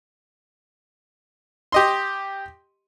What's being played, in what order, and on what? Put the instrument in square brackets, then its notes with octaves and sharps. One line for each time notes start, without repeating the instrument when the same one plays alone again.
[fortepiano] G4 D#5 C6